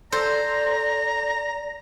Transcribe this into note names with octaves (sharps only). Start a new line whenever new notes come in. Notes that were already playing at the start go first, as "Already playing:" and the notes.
A4 C5 D5 A#5